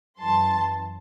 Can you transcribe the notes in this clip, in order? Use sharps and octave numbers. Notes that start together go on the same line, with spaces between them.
F#2 E3 A5 C6